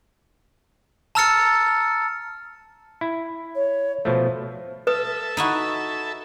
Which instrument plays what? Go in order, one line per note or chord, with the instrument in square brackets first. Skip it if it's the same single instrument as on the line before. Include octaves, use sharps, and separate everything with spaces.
[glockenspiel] A5 A#5 E6 F6 A6 C#7
[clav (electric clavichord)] E4
[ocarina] C#5
[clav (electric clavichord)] B2 F3 A3 [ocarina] C5
[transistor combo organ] A4 E5 [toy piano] B4 D#6
[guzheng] D#4 E4 F#4